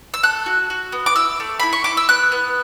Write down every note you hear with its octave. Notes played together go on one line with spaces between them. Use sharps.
E6
A4 F#6
F#4
F#4
B3
D6
E4 E6
A3
E4 B5
C#6
E4 D6
E6
B3 F#6
B3